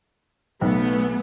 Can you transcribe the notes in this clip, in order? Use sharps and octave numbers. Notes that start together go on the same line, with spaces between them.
B1 A3 B3